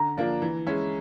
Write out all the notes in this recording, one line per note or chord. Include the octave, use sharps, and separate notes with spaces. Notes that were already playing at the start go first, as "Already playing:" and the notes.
Already playing: D3 A#5
F3 A#3 D4 F4
E3
G#3 C#4 E4